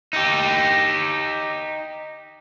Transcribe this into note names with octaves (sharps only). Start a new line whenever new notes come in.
D#4 G4